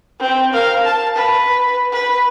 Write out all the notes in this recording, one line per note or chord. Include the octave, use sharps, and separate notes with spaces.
C4
A#4 F5
A5
B4
B4